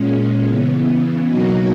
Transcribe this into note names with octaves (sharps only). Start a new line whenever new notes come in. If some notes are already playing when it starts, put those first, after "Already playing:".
Already playing: A#2 G#3 C#4
C#3 E3 B3
B2 F#3 A#3 D#4 F#4